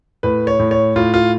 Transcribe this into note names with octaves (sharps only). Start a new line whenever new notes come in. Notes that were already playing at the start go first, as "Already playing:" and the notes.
A2 B4
C#5
A2
C#5
A2 F4
F4